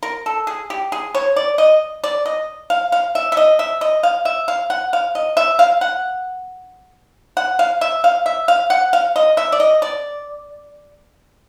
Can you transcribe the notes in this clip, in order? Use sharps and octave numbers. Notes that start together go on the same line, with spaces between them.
A#4
A4
G#4
G4
G#4
C#5
D5
D#5
D5
D#5
F5
F5
E5
E5
D#5
E5
D#5
F5
E5
F5
F#5
F5
D#5
E5
F5
F#5
F#5
F5
E5
F5
E5
F5
F#5
F5
D#5
E5
D5
D#5
D5